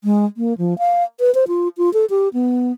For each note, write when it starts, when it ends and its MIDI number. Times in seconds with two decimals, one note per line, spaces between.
0.04 0.25 56
0.37 0.57 58
0.58 0.77 53
0.78 1.03 77
1.20 1.33 71
1.35 1.45 72
1.48 1.68 65
1.78 1.92 65
1.93 2.05 69
2.10 2.29 67
2.34 2.72 59